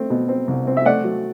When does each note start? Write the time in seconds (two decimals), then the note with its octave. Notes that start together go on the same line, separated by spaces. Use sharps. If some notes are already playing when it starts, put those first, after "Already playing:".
Already playing: A3 C4
0.10 B2
0.29 C4
0.48 C2
0.67 C4
0.77 E5
0.85 A3 D5 F#5
1.04 F#3